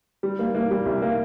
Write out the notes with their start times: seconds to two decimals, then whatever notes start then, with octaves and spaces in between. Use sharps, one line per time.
0.23 G3
0.39 A#3
0.55 A#3
0.71 G3
0.86 C2
1.02 A#3